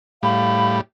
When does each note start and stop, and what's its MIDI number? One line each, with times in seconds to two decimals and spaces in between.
0.23 0.81 45
0.23 0.81 55
0.23 0.76 77
0.23 0.75 83